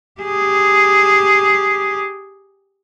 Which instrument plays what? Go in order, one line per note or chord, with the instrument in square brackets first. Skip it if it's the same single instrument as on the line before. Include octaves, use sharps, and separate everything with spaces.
[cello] G4 G#4